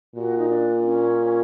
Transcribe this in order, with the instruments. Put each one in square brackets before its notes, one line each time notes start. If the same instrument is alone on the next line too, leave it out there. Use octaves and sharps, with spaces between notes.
[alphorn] A#2 [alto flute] F#4
[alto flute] D#4
D4
C#4